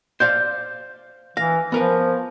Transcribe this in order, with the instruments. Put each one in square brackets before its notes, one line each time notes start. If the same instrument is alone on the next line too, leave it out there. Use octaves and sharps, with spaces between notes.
[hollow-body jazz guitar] C5 D5 F5 [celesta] G6
[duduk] E3 [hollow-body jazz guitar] F5 [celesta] A#6
[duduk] F3 [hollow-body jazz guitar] B3 A#4 B4